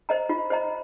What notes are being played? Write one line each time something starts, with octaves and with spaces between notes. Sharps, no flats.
C5 D#5 A#5
F4
C5 D#5 A#5